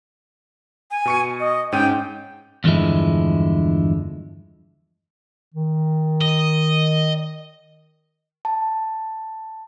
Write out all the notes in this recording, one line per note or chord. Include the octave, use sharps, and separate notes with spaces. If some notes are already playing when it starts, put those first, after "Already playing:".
G#5
B2 C#6 C#7
D#5
G#2 C#4 G5 D#7
E2 G2 D3 F3 G#3 E4
D#3
D#5
A5